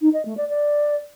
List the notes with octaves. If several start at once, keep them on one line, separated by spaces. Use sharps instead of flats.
D#4
D#5
A3
D5
D5